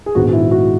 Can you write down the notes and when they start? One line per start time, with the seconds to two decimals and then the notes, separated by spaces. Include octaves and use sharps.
0.06 G#4
0.15 A#1 G#2 D#3 G#3 B3 F#4
0.33 E4
0.51 F#4